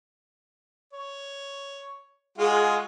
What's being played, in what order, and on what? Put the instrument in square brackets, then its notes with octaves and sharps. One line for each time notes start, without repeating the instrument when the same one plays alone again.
[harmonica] C#5
[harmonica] G#3 F4 F#4 [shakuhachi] G#4